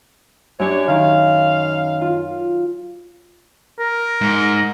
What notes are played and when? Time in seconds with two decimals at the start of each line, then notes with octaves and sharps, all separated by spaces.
0.60 F#2 D4 G4 C#5
0.88 D#3 F5
2.01 F4
3.79 A#4
4.21 G#2